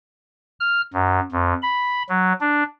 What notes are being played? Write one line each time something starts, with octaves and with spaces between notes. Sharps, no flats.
F6
F#2
F2
B5
F#3
D4